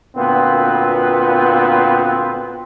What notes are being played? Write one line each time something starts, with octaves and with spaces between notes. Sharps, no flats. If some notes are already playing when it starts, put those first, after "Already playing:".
D2 A#2 B3 C4 F4 B4